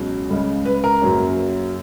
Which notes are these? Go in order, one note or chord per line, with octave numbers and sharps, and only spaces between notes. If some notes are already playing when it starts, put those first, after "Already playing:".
Already playing: C#2 B2 F#3
C#2 C#3 G#3
B4
A#4
F#2 C#3 F#3 A#3 C#4